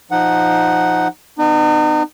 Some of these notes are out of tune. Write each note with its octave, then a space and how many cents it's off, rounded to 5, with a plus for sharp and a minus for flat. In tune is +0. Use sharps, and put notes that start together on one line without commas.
F3 +0 D#4 -5 F#5 +0
B3 +20 D#4 -40